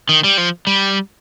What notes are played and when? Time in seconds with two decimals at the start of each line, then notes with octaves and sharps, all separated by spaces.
0.09 D#3
0.24 G3
0.38 F3
0.67 G3